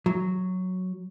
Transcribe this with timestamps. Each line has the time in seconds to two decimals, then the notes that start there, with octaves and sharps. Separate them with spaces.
0.06 F#3